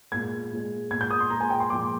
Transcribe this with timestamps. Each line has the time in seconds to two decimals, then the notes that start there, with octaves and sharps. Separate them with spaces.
0.12 A#2 G#3 G#6
0.52 A#2 G#3
0.91 A#2 G#3 G#6
1.01 G6
1.10 D#6
1.20 C6
1.30 A#2 G#3 A#5
1.40 G#5
1.50 G5
1.60 C6
1.70 A#2 F3 G#3 D6